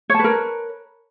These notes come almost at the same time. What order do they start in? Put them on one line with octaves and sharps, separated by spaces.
C#5 A5 B4 A#4